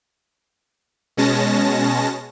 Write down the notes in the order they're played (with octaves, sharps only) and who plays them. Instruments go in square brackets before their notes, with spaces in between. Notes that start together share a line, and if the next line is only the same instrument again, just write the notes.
[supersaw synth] B2 G#3 C#4 A5 A#6